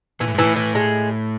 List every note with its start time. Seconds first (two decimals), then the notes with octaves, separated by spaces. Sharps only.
0.20 A#2 E3
0.28 A2
0.34 G#2
0.38 A2 E3
0.56 E3
0.75 G#3